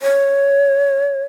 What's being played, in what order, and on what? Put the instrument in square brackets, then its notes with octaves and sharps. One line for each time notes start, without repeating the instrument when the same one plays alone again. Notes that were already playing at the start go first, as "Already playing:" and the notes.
[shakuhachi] C#5